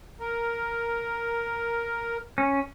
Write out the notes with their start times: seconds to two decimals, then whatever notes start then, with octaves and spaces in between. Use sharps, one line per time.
0.20 A#4
2.38 C#4